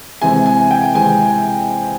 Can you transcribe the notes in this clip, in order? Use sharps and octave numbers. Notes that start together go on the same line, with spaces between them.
C3 E3 G#3 C4 G#5
G#5
G5
C3 E3 G#3 C4 G#5